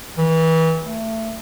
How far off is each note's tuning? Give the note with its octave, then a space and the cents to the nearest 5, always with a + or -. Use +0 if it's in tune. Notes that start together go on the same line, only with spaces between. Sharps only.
E3 -30
A3 +20